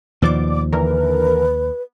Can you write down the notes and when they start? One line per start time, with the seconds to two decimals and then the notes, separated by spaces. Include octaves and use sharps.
0.22 D#2 B2 F3 D5 D6
0.73 D3 E3 A#4 B4